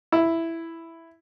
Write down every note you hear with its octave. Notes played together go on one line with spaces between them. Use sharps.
E4